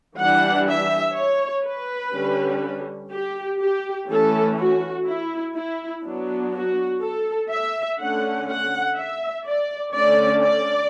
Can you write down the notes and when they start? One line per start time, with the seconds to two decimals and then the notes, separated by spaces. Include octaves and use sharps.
0.19 E3 G3 D4 F#5
0.67 E5
1.16 C#5
1.65 B4
2.13 D3 G3 C#4
3.11 G4
3.60 G4
4.09 E3 A3 C#4 A4
4.58 F#4
5.06 E4
5.55 E4
6.04 F#3 B3 D4
6.53 F#4
7.01 A4
7.51 E5
8.00 D3 A3 C#4 F#5
8.48 F#5
8.98 E5
9.46 D5
9.94 D3 A3 C#4 D5
10.43 D5